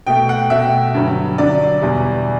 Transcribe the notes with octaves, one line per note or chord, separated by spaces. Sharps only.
B2 A3 G5
F#5
B2 A3 E5
G2 D3 F#3
G2 D3 F#3 D5
E2 B2 G3